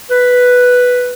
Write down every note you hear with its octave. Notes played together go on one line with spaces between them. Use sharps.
B4